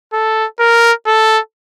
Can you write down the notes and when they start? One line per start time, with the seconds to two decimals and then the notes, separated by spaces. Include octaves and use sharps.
0.13 A4
0.60 A#4
1.07 A4